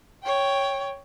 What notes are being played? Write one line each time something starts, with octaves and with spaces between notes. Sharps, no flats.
C#5 G5